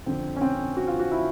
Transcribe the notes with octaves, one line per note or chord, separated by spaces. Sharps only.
F2 D3 C4
C#4
C4
F#4
F4
F#4
E4